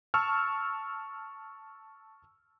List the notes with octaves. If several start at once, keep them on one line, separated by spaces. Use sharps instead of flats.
A5 C#6 E6 F6